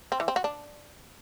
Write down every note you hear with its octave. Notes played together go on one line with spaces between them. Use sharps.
C4
E3
C4
F#4
D4